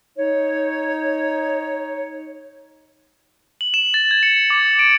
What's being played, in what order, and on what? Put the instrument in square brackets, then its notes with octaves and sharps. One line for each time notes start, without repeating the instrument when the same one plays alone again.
[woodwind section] D#4 C#5
[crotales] F#7
E7
A6
G#6
C#7
D6
D7